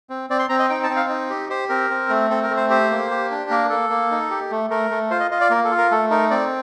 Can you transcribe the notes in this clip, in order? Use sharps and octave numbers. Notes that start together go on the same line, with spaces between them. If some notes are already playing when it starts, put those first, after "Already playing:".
C4
C4 D5
C6
C4 A#5
D#5
D#4 G5
A5
C4
F5
D#4
G4
G4 C5
C4 A#4
C4
A3
C4 A4
A#4
A3
C5
G4 C5
A#3
G4
D4
A#3 A#4
A#3 A4
A#3
D#4
G4
A3
A3 A#4
A3
F4 C5
D#5
F4 D#5
D5
A#3 A#4
A4
F4
A#4
A3 A4
D#4 A#4
C4 D5